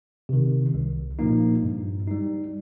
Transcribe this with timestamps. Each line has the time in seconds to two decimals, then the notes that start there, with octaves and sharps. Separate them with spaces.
0.29 C3 D#3
0.74 C2
1.19 A#2 F3 A#3 D#4
1.63 G2
2.07 G3 D#4